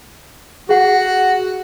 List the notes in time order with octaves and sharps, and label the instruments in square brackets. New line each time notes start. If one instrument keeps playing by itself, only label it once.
[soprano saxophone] F#4 [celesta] G#4 F#5